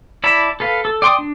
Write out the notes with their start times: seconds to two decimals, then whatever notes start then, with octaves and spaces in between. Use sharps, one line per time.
0.24 E4 D5 A5 B5
0.60 A4 B4 F5
0.85 A4
1.02 D5 G5 C6 C#6 D#6
1.19 D4